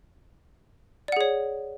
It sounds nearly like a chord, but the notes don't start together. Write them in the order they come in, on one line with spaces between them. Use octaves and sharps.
D5 F#5 G#4 C#5